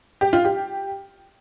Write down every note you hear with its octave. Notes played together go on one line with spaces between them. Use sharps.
G4
F4
G4